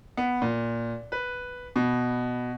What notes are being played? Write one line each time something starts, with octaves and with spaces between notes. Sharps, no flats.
B3
A#2
B4
B2